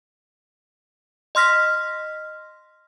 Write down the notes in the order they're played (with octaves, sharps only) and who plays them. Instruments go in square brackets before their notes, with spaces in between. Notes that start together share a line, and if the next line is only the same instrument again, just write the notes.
[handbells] D#5 C6 F6 A#6 B6